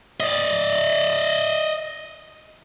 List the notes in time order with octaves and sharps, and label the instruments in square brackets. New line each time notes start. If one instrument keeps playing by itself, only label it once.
[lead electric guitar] D5 D#5